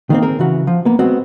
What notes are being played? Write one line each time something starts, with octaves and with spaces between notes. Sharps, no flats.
D#3 A#3 C4
C4 G#4 A#4
C#3 E3 F#4
F3
A#3 B3
G#3 B3 C4 F#4